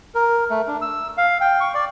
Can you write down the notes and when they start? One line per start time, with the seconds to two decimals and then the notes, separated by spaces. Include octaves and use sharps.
0.15 A#4
0.50 A3
0.68 D4
0.81 E6
1.17 F5
1.41 G5
1.61 C#6
1.74 D5